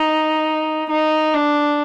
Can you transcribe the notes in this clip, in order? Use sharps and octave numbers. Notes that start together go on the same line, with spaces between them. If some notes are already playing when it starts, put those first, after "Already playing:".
Already playing: D#4
D#4
D4